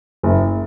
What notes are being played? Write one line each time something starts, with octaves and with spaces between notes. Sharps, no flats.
F#1